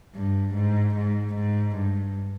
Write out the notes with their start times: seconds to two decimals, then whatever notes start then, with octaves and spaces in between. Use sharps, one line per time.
0.15 G2
0.55 G#2
0.95 G#2
1.35 G#2
1.76 G2